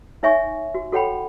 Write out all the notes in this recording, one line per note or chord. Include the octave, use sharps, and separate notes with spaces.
D#4 C#5 E5 G#5 C#6
F#4
F#4 A4 C#5 F#5 G5 B5